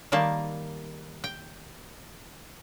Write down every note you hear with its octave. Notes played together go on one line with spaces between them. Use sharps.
D#3 G3 A#3 A5
G5